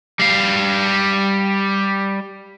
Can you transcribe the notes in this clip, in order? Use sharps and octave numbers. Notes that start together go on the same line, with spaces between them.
G3 F5